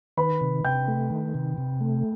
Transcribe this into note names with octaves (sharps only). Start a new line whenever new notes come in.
D#3 B4 B5
C3
C3 G5 G6
A3
D#3
C3
C3
A3